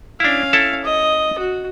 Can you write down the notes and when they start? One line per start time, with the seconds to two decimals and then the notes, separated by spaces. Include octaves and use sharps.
0.20 C#4 D4 E4 F5
0.53 E4 A4 A5
0.84 D#5
1.39 F#4